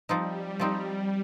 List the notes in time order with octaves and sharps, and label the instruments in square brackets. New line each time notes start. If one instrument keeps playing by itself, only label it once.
[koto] F3 C4 D#4 [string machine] G3
[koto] F3 C4 D#4